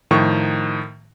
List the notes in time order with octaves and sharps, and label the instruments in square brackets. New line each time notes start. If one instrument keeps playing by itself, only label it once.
[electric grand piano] A2 D#3 F3 C#6